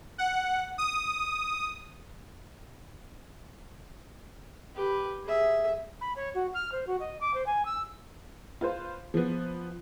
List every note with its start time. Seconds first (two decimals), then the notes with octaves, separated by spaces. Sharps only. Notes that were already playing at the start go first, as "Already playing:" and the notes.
0.18 F#5
0.78 D#6
4.75 G4 B4
5.25 G#4 E5
6.01 B5
6.16 C#5
6.34 F#4
6.54 F6
6.72 C5
6.87 F#4
7.00 D#5
7.21 D6
7.34 C5
7.46 G#5
7.65 E6
8.61 F4 B4 C5
9.14 F3 B3